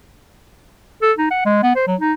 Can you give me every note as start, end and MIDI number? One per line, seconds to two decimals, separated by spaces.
1.02 1.13 69
1.19 1.28 63
1.31 1.44 78
1.46 1.58 56
1.63 1.73 59
1.76 1.86 72
1.87 1.96 54
2.01 2.13 63